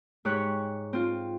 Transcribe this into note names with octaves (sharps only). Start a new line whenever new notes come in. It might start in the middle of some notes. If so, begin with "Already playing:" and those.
G#2 G4 C#5 C#6 F#6
C4 F4